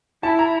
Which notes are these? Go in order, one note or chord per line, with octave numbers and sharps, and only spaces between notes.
E4 A5
A#5